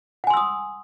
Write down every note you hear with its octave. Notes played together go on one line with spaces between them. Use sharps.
F#5 G#5 C6 D#6 E6